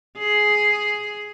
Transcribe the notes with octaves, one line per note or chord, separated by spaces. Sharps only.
G#4